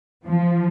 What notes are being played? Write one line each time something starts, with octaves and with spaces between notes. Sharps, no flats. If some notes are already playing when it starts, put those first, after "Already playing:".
F3